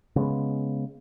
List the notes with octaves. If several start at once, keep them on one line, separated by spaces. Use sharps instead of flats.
C#3 G#3 B3